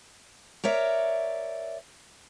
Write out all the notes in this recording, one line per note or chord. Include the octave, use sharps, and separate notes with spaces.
A#4 C#5 D5 E5